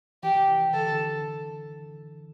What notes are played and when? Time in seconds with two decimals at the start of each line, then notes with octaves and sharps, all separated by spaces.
0.23 E3 G4
0.35 E3
0.48 E3
0.74 D3 A4
0.92 D3